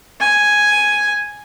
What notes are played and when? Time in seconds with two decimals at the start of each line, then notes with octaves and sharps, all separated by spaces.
0.20 G#5